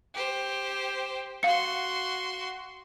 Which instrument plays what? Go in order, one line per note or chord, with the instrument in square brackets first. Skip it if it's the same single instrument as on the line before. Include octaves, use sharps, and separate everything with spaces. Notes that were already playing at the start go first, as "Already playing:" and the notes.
[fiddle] G4 C5
[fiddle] F#4 C6 [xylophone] F5 C#7